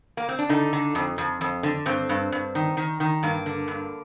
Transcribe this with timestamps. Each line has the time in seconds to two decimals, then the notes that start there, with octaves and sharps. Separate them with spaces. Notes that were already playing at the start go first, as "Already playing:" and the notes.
0.17 A#3
0.29 C4
0.39 D4
0.49 D3 D#4
0.73 D3
0.95 F2
1.18 F2
1.41 F2
1.63 D3
1.86 G2 C4
2.09 G2
2.32 G2
2.55 D#3
2.77 D#3
3.00 D#3
3.23 G2 A#3
3.46 D3
3.68 G2